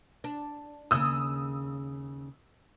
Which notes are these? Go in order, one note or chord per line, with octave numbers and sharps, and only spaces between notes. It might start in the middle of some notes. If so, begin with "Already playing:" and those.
D4
D#2 C#3 D#6 E6